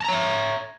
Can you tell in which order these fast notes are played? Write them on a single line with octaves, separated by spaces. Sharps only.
A5 A#5 C#5 E5